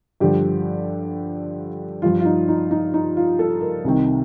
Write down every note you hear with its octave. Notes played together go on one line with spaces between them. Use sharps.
G2 D3 F3 G4
G2 F3 F4
F4
D#4
D#4
D#4
D#4
F4
A4
A#4
C2 C3 D#3